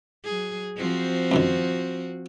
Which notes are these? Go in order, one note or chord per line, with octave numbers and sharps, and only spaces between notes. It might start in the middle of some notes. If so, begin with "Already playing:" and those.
F#3 G#4
F3 C4 F#4
C#2 F#2 D#3